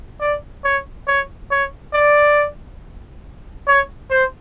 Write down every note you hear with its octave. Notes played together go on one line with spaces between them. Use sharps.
D5
C#5
C#5
C#5
D5
C#5
C5